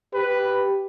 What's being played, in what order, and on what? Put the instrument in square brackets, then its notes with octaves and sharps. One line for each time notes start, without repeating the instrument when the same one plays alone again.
[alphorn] G4 [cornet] B4